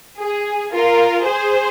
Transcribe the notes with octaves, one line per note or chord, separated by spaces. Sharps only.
G#4
F4 A#4
G#4 C5